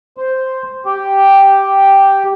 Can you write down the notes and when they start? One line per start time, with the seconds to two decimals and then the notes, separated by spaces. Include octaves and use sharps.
0.17 C5
0.85 G4